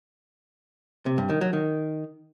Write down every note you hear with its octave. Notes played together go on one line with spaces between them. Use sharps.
C3
G2
D#3
F#3
D#3